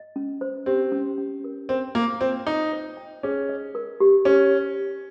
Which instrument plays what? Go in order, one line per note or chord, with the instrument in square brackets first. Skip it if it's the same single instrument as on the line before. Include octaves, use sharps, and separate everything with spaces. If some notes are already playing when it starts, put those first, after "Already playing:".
Already playing: [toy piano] D#5
C#4
C5
[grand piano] C4 [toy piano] G4
[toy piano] C#4
C#4
A#4
[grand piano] C4 [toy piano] A#4
[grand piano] A#3 [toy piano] F4
[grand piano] C4 [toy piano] F4
[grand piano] D#4 [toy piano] C#5
[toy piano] C5
G5
[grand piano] C#4 [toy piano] G#4
[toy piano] D#5
A#4
G4
[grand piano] C#4 [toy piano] G4